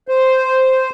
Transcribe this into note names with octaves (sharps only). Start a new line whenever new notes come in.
C5